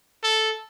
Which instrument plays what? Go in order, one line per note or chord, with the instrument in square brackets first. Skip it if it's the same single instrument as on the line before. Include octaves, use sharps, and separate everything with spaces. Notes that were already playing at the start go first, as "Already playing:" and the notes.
[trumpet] A4